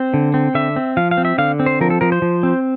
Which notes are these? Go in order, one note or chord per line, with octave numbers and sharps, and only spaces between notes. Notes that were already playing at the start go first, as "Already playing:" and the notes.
Already playing: C4 C5
D3
C4
D3 E5
C4
F3 F5
F5
C4
E5
D3 F5
C4
C5
F3 A#4
A4
F3 A#4
C5
F3
C4